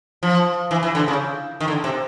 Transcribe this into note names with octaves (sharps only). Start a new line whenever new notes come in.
F3
E3
E3
D3
C#3
D#3
D3
C3